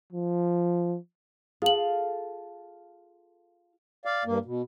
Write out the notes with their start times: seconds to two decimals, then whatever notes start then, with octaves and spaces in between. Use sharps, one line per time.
0.12 F3
1.62 F4 G#4 A4 F5 F#7
4.05 D5 F5
4.26 G2 A#3
4.45 B2